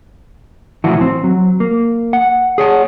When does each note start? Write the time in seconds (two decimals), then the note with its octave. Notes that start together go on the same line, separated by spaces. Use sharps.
0.84 B1 A2 E3 F3 E4 F#4
1.01 C4
1.24 F#3
1.60 A#3
2.13 F#5
2.58 G#4 C#5 F#5